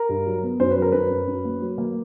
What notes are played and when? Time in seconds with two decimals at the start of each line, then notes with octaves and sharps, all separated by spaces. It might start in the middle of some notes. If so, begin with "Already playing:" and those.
Already playing: A#4
0.09 G2
0.26 F#3
0.43 B3
0.60 F#2 C5
0.71 B4
0.77 F#3
0.82 A#4
0.92 F#2 B4
1.10 F#2
1.27 F#2
1.45 A#3
1.62 F#3
1.78 A#3